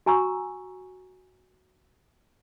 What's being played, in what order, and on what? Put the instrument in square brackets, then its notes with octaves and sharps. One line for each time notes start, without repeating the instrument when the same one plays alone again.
[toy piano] F#4 G#5 A#5 C#6 E6